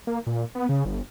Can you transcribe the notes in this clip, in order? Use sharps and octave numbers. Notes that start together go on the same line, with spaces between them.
A#3
A#2
B3
C#3
G1